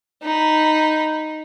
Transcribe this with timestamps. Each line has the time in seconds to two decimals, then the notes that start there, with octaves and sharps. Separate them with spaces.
0.23 D#4 B5